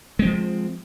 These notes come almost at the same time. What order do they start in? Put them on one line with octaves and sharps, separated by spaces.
G#3 C4 F3